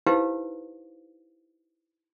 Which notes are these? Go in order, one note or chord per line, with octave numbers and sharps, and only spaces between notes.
D#4 E4 G4 B4 C5 F5